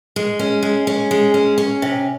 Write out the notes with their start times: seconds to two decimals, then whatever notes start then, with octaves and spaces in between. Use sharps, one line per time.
0.16 G#3
0.39 C#4
0.63 G#3
0.87 C#4
1.11 G#3
1.34 C#4
1.58 C#4
1.82 C3